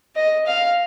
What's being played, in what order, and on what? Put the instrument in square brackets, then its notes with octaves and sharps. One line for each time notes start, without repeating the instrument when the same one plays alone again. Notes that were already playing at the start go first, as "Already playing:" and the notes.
[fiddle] D#5
F5